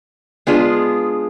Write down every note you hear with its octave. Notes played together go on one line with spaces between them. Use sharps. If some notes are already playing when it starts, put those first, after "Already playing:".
G#3 B3 D4 F4 G#4